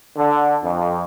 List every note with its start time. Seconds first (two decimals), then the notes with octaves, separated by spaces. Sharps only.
0.16 D3
0.64 F2